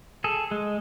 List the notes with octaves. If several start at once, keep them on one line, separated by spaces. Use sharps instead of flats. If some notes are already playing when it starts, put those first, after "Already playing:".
G#4 A4
G#3